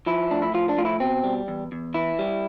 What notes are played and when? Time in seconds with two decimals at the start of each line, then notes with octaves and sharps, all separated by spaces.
0.06 F3 E4
0.30 A2 D4
0.42 E4
0.54 F3 F4
0.69 D4
0.78 A2 F4
0.85 E4
1.00 B2 C4
1.24 G3
1.48 E2
1.72 E2
1.94 E3 E4
2.19 G3